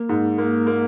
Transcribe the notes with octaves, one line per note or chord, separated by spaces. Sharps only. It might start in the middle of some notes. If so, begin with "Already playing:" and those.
Already playing: A#3
G#2
A#3
A#3